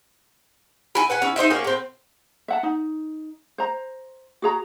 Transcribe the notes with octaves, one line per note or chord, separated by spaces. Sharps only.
E4 G#5
B4 F#5 G#5
C#4 E4
D#4 C5 D#5 E5
A#3 C#4 F#4 G#4
A2 C4
E5 F#5 A5
D#4
C5 A#5
F#4 G#4 A#5